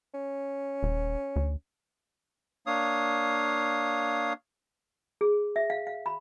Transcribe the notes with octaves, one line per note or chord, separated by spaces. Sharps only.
C#4
D#1
D2
A#3 D4 C#5 F5 D#6
G#4
E5
F5
F5
B5